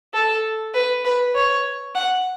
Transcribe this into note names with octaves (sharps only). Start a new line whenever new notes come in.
A4
B4
B4
C#5
F#5